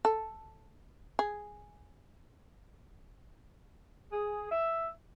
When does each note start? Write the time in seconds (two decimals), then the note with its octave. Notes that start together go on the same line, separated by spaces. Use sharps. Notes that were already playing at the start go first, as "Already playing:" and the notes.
0.05 A4
1.19 G#4
4.12 G#4
4.51 E5